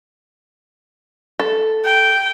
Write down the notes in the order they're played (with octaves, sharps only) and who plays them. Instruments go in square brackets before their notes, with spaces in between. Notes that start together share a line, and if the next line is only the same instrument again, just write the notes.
[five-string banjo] A4
[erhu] G5